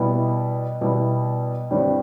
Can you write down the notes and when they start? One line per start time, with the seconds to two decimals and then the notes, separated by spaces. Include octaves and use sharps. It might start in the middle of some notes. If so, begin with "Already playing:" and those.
Already playing: B2 G3 B3 E4
0.81 B2 G3 B3 E4
1.70 G2 D3 G3 C4 E4